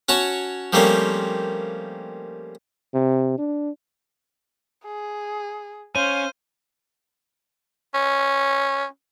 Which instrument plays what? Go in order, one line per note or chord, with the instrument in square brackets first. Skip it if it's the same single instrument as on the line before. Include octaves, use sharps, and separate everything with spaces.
[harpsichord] C#4 F#4 C#5 A5
F3 G3 A3 A#3 C4 C#4
[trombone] C3
D4
[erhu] G#4
[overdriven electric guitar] C#4 [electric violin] C5 [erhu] F5 [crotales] D#7
[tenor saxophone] C#4